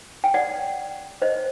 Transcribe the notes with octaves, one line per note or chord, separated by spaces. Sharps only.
G5
D5 F#5
C5 D#5